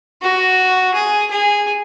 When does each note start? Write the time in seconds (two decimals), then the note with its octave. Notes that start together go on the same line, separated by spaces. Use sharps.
0.22 F#4
0.94 G#4
1.30 G#4